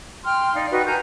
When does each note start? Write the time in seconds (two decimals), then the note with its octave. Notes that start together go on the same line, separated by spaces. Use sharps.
0.24 G5 C6 F6
0.55 D#4 D5 F5
0.71 D#4 F#4 B4 G5
0.86 A#4 G#5 A#5 G6